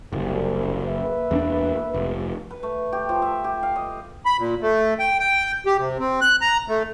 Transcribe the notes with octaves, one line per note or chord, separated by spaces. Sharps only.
F#1 C2
A#3 B4 E5
E2 C4 D4
F1
B4
A3
G4
F3
E5
G4
F5
D#5
B5
A#2
A3
G5
G5
G4
C3
C4
F#6
A#5
A3